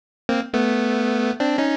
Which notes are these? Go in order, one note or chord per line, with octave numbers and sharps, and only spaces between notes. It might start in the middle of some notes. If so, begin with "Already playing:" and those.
A#3 C4
A3 B3
C4 D4
C#4 D#4